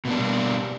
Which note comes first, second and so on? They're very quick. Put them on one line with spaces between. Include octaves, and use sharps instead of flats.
B2 A#3 D4 G3